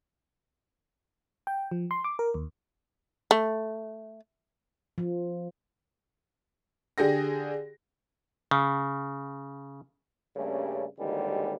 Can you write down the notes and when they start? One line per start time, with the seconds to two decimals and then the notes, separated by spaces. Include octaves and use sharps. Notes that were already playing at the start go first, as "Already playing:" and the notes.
1.47 G5
1.71 F3
1.91 C6
2.04 D6
2.19 A#4
2.34 D#2
3.31 A3
4.98 F3
6.98 D3 G4 G#4 A#6
8.51 C#3
10.36 G2 C#3 G3 A3 A#3 C#4
10.98 G#1 D#2 D3 E3 G3 G#3